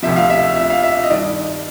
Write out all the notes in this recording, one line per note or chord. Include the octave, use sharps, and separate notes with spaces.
D2 C3 F3 E5
F5
E5
E5
F5
E5
D#5
G2 D#3 D5